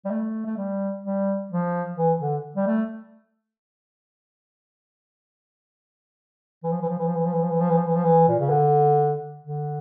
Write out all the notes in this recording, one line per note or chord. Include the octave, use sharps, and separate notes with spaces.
G3
A3
A3
G3
G3
F3
E3
D3
G3
A3
E3
F3
E3
F3
E3
F3
E3
F3
E3
F3
E3
F3
E3
F3
E3
F3
E3
A#2
C#3
D3
D3